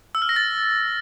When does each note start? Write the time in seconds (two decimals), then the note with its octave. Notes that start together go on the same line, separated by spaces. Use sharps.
0.15 E6
0.22 F6
0.29 A#6
0.36 A6